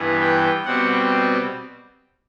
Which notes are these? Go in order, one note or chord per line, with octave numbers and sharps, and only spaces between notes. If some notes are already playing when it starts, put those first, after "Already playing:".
Already playing: G2 E3 B3
G5
B2 G3 C4 F#5